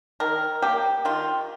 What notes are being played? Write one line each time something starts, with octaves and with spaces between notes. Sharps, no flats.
D#3 A#4
A#3 G4
D#3 F4